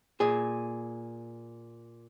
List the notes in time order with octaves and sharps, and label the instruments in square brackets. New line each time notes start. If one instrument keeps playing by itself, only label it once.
[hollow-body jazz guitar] A#2 G#4